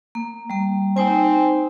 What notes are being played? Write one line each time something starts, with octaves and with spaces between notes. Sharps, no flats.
A#3
G3 A#3
C4 D#4 C5 G#5